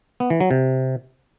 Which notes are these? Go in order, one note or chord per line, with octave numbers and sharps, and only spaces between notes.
B3
E3
F#3
C3